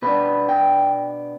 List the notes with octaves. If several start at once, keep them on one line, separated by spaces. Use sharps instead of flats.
B2 B3 D4 B4
G5